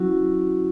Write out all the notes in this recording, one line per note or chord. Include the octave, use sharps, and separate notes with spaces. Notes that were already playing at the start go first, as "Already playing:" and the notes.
Already playing: F#3 C#4 E4 F#4